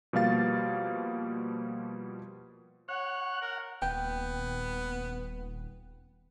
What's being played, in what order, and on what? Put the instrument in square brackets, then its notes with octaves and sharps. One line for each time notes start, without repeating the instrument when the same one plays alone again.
[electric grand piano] B2 F3 G3 A#3 F5 A6
[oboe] C#5 [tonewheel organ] F#5
[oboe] A#4
[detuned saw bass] D#1 [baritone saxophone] B3 [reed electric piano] G5